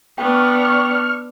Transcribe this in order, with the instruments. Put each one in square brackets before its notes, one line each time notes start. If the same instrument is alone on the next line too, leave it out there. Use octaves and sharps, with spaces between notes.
[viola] B3 D4 [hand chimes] G5 [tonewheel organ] C#6 F6